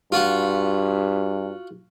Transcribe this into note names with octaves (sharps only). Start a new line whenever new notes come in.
G2 F4 F#4